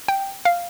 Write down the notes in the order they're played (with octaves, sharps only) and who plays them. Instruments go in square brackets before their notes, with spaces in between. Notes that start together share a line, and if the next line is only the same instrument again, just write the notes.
[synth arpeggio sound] G5
F5